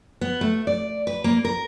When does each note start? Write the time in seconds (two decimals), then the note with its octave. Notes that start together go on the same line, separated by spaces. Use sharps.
0.21 B3
0.41 A3
0.67 D5
1.07 B4
1.24 A#3
1.45 A#4